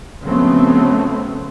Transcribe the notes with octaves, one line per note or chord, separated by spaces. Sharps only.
C#3 F3 F#3 A3 B3 C4